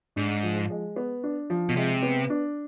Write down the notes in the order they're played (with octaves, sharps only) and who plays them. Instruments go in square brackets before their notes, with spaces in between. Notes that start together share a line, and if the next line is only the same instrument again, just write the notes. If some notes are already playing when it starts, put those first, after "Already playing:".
[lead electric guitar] G#2 [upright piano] D4
[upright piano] F3
G#3
B3
D4
F3
[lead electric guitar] B2
[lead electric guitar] C3 [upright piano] G#3
[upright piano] B3
D4